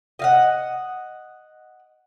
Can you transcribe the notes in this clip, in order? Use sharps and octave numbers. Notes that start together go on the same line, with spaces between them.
D#5 F5 F#5